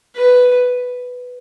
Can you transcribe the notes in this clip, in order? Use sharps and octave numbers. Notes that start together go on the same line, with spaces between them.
B4